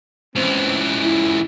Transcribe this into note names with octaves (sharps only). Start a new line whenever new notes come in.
C#2 E3 C4
E4